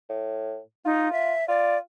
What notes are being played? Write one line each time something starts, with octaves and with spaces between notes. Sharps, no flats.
A2
D#4 F4
E5
F4 D5